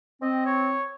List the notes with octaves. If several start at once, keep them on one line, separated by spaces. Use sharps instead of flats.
C4 D#5
C#5